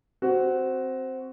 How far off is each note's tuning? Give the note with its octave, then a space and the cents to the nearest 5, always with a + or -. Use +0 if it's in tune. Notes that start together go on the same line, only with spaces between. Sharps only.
C4 +0 F#4 +10